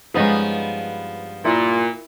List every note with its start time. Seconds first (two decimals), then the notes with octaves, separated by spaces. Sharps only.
0.14 G2 F3 G#3 B3 C#4 D#4 B4
1.45 A#2 E4